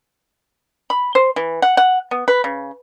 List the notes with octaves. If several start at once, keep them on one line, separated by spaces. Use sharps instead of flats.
B5
C5
E3
F#5
F#5
B3
B4
C#3